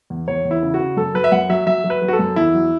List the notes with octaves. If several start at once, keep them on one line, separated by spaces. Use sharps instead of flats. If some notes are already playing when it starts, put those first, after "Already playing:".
E2
E2 C#5
E2
E4
C#3
F#4
C#3
F#2 A4
F#3 B4
E5
F#2 F#5
F#3 E5
F#3 E5
F#3
B4
F#3
F#4
A4
F#2
E2 E4
F#3